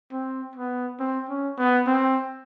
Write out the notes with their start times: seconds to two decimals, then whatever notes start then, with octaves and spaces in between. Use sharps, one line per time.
0.12 C4
0.55 B3
0.99 C4
1.29 C#4
1.58 B3
1.87 C4